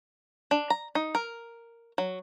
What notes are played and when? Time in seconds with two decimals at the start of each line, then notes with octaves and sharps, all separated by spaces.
0.51 D4
0.70 A#5
0.95 D#4
1.15 A#4
1.98 F#3